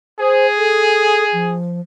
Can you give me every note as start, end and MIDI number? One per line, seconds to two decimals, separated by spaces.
0.20 1.55 68
0.20 0.46 72
0.57 1.25 69
1.33 1.81 53